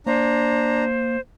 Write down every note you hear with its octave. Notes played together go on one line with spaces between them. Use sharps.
A#3 D4 C5 A#5